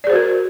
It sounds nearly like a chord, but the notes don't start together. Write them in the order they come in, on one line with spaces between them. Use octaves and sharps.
D5 G#4 C5 F#4 A#4